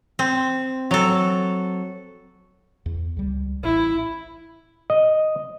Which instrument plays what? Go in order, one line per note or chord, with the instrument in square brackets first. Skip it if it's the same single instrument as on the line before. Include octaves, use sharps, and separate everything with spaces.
[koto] C4
F#3 A4
[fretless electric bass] E2
C#2 G3
[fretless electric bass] A1 [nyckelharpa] E4
[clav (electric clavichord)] D#5